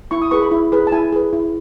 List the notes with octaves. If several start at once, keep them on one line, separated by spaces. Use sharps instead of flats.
E4 C#6
D#6
G#4 B4 C#6
B5
E4
G#4 B4
A5
E4 G#5
G#4 B4
E4